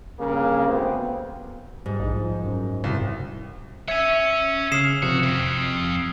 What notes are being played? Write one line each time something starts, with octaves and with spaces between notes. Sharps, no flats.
G2 C#3 A#3
D2 B3 C4
G#2 G3
A#1 D#4
F3
F#2
C2
C#5 E5 G#5 E6 G#6 B6
C#3 D#6 F6 C7 E7
C3 F3 F#4
F2